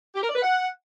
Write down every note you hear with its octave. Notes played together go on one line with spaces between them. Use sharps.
G4
A#4
D5
B4
F#5